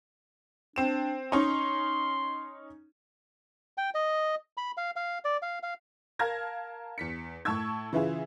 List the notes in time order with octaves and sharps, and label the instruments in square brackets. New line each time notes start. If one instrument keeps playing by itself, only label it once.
[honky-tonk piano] C4 E7 [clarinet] D4
[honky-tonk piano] C#4 D#4 [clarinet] C6
[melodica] G5
D#5
B5
F5
F5
D5
F5
F5
[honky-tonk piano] A#4 F5 A5 F6 G#6 A#6
E2 B6 C#7
A2 A5 C#6 E6 G#6
C#3 E3 E4 F4 G#4